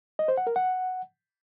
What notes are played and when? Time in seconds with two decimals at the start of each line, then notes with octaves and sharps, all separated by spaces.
0.19 D#5
0.28 C5
0.37 F#5
0.47 A#4
0.56 F#5